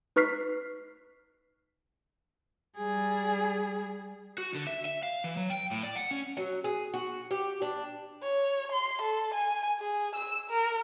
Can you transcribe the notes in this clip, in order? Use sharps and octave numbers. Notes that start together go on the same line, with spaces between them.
D#4 B4 C#6 F6 B6 C7
G3 G#4
F#4
D3
E5
E5
F5
E3
F#3
G5
A2
D5
F#5
C#4
F#3
G#4
F#4
G4
D4
C#5
C6
A4
G#5
G#4
E6
A#4